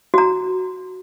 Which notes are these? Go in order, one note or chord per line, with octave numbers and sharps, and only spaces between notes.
F#4 A#5